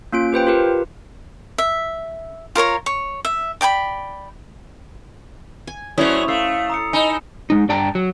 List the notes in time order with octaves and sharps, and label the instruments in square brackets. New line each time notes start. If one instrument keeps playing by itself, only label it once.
[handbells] A#3 C#4 F4 D7
G4 B4 C5 G5
F4 G4 A#4 B4
[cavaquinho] E5
F4 A#4 C#5 A#5
C#5
E5
D5 G5 G#5 B5
[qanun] G#5
[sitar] F#3 A3 C#4 [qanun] E4 C5 [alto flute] D5 [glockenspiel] D#6 F7
[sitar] A3 [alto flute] F5 [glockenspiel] E6 C7
[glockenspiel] A#5 D#6 C#7
[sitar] D#4 [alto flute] D#5 [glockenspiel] G#5 B5 E7
[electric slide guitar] G#3 D#4
G2 D4 D5 G5 A5 A#5
F#3